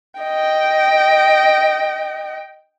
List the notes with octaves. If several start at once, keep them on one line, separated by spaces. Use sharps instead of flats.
D#5 G5